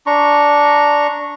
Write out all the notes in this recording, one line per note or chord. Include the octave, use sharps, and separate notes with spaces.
D4 A#5 C#6